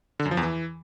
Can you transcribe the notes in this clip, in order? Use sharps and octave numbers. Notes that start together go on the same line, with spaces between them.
D3
F#2
F3
E2
E3